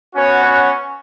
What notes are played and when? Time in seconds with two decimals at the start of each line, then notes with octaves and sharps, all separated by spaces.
0.15 B3 C#4 F#4 C#5
0.44 C#4 C#5